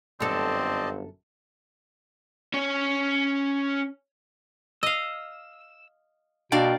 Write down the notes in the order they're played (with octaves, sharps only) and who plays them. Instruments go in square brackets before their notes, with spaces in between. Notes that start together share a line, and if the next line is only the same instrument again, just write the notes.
[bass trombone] G1 [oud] F#2 A4 [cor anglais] C4 [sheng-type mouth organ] D5 D#5 A5
[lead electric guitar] C#4 C#5
[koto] D#5 F5 [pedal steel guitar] E6
[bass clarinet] B2 [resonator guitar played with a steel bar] A#3 D4 F5 [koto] D5 [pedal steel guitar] G5